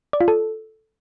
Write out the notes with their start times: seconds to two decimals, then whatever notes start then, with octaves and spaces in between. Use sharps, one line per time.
0.13 D5
0.21 F4
0.28 A4